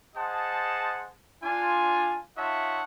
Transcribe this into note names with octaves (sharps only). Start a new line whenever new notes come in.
G#4 C5 D#5 F#5 A5
D4 F4 G#5
D#4 F4 C#5 E5 F#5 A5